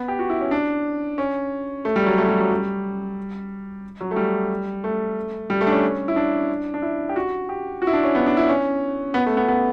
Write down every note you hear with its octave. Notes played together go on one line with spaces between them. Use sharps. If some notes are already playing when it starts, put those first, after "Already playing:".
Already playing: B3
G4
F#4
E4
C#4
D4
C#4
A3
G3
F#3
A3
G3
F#3
G3
F#3
A3
G3
A3
G3
A3
D4
C#4
E4
D4
D4
E4
G4
F#4
G4
F#4
E4
D4
C#4
B3
D4
E4
C#4
B3
A3
B3
B3